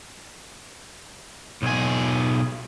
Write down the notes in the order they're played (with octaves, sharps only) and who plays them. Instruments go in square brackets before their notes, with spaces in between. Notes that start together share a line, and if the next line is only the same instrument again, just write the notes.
[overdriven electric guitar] B1 G#4